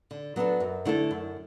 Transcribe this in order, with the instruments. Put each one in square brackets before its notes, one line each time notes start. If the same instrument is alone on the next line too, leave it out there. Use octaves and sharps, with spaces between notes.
[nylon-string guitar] D3
F#3 B3 D4 A4
F#2
D3 A3 E4 A4
F#2